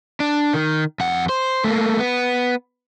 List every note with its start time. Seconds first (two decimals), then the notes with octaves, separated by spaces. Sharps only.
0.20 D4
0.54 D#3
1.00 F2 F#5
1.29 C5
1.64 A3 A#3
1.99 B3